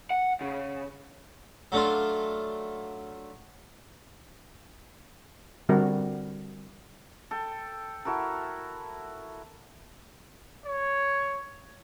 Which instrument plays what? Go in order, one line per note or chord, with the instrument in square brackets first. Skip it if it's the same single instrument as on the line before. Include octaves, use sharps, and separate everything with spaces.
[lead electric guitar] F#5
C#3
[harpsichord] F#3 A3 D4 F4
[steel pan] D3 G3 C4 F#4 A#4
[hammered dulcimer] A4 G5
E4 F#4 A4 A#4
[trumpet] C#5